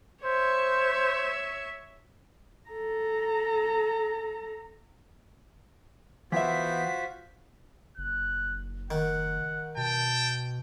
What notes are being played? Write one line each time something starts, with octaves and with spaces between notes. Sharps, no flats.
C5 C#5 E5
A4 A#5
E3 B3 F4 F#4 C5 E5 G5 B6
F#1 F#6
D#3 F#5
B2 G5 A5